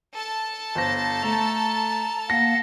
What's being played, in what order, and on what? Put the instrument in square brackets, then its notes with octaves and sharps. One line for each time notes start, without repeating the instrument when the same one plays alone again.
[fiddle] A4 A5
[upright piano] G1 C5 A#6
[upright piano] A3 [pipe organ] A#5
[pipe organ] A#3 F5 F#5 [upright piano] A#6